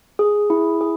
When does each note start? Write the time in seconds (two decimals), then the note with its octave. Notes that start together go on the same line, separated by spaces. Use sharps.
0.19 G#4
0.50 E4
0.81 G#4